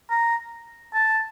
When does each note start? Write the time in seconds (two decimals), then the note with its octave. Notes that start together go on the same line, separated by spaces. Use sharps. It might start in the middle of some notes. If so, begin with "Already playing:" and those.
0.10 A#5
0.94 A5